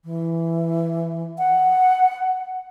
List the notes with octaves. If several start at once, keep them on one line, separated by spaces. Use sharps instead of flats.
E3
F#5